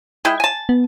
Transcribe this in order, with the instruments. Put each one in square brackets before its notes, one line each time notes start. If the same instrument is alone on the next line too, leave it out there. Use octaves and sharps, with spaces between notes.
[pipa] G#3 E4 G5
G#5 A5
[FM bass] B3